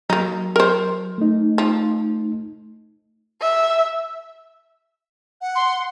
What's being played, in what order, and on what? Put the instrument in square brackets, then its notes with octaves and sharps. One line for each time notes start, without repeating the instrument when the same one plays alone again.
[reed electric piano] F#3 [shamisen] A#3 D#4
[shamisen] A#4 C5
[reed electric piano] A3 D#4
[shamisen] F3
[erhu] E5
[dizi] F#5
[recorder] C6